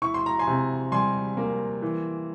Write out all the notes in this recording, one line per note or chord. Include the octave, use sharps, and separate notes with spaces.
E4 C#6
C6
A#5
G#5 C6
C3
G3 G#5 C6
A#3
E3